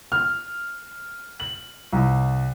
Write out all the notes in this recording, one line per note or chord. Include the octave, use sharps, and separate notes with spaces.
F6
F#7
C2